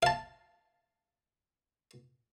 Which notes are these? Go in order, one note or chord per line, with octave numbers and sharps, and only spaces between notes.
F5 A5